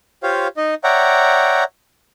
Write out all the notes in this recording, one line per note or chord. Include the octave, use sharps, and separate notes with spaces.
F4 G4 C5 C#5 F5
D#4 D#5
C#5 D5 E5 F#5 G5 A#5